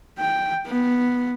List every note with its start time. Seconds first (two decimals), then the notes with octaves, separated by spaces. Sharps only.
0.19 G5
0.67 B3